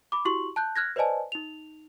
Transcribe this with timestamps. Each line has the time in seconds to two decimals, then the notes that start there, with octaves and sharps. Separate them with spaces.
0.12 B5 D6
0.25 E4 F#4 G4 C6 C#6 F#7
0.56 A5 F#6 G6
0.76 F6 F#6 G#6 A#6
0.96 B4 C5 D5 D#5 G#5 A5
1.32 D#4 F7